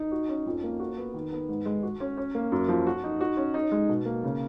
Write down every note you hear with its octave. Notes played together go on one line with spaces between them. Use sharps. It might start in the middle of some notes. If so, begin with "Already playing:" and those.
Already playing: D#4
F#4
C#4
F2
A#3
F#4
B3
D#3
B3
G#2
G#3
F#4
C#4
C#4
A#3
F#2
F3
F#4
D#4
F#4
C#4
D#4
G#3
B2
A#3
C#3